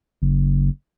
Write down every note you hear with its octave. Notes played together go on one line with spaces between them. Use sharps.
F#1